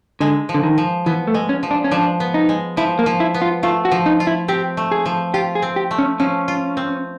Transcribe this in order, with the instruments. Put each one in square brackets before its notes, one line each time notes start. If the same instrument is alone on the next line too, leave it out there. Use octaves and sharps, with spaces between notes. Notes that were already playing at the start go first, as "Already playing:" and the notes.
[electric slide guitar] D3 [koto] G#3
[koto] F3
[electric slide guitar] D3
D#3
[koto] F3
[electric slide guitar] E3 [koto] B3
[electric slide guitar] A3
[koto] G#3
[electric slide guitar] C#4
[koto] F3
[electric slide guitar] D4
C#4
[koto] F3 [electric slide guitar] D4
[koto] B3
[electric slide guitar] D#4
[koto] G#3
[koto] F3 [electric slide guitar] E4
[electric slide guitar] A#3
[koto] F3
[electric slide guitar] E4
[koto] B3
[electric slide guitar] F4
[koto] A3 [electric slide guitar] F4
[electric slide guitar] F#4
[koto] F3
[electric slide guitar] D#4
[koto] F4
[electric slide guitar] E4
[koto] C4 [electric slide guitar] G4
[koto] A3
[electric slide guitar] G#4
[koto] F3
[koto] F4 [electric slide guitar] G4
[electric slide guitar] G#4
[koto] C4
[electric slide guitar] G4
[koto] A3
[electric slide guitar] C#4
[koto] F3 [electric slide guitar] C#4
[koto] F4
C4